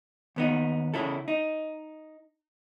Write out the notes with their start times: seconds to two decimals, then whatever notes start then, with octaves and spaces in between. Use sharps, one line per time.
0.36 D#2 B3 D#4
0.94 C#3 E4 A4
1.28 D#4